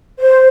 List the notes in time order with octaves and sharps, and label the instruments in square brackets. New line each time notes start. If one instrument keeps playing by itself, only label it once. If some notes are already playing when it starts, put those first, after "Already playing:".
[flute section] C5